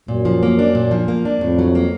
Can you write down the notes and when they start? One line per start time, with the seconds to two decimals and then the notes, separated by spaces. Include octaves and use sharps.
0.08 F#2 A#2
0.25 F3
0.43 A#3
0.59 D4
0.75 A#2
0.91 F3
1.08 A#3
1.25 D4
1.41 F2 A2
1.59 F#3
1.75 A#3